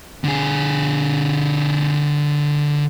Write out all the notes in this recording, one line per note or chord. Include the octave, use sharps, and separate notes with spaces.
D3 G#4